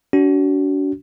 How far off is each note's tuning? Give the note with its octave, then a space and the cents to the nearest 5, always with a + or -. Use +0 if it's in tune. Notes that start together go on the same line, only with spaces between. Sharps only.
D4 -45 F#4 +25